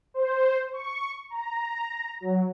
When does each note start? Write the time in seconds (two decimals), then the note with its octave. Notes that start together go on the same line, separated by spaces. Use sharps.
0.14 C5
0.73 C#6
1.30 A#5
2.21 F#3